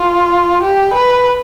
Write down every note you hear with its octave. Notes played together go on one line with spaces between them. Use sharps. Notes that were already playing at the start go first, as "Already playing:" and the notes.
Already playing: F4
G4
B4